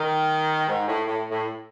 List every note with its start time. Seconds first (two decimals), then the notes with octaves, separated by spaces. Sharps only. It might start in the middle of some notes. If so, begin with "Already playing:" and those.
Already playing: D#3
0.68 G#2
0.87 A2
1.07 A2
1.31 A2